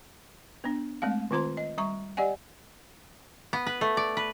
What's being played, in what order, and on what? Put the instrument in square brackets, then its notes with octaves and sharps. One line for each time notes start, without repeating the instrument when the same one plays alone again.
[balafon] B3 D4
G#3 A3 C4 F5
D#3 C4 F4 C5 A#5 C6
D#5
G3 A#5 C#6
G4 D5 D#5 F#5 G#5
[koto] B3
B4
A3
D5
B4